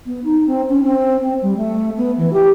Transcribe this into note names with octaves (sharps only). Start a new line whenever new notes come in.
B3
D#4
C4
C#4
C4
C4
G3
A3
B3
E3
G4